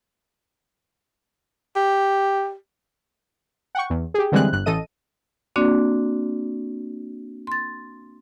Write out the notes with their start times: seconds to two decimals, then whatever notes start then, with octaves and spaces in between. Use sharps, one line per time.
1.76 G4
3.75 F#5 G5 C#6
3.90 E2
4.14 G4 G#4
4.32 D3 E3 G3 G#3 C4 F#6
4.53 G1 F#6
4.66 A1 A4 D#5 D#7
5.56 A#3 C4 D4 F#4 D5
7.47 C6 A6